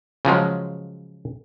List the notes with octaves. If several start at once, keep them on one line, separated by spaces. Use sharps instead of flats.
C#3 F3 F#3 G#3